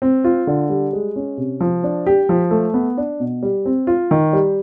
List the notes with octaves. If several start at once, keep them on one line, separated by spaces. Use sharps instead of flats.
C4
F4
D3
G3
G#3
C#4
C3
F3
D4
G4
F3
A3
B3
D4
B2
G3
C4
F4
D#3
G3